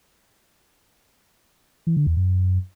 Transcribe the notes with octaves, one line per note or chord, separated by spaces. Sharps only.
E3
D3
E2
F#2